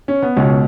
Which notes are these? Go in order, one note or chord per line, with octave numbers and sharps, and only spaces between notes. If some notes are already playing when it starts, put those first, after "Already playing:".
C#4
B3
C#2 B2 C#4